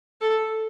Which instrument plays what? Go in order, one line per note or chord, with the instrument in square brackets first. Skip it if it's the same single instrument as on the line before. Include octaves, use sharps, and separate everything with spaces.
[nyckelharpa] A4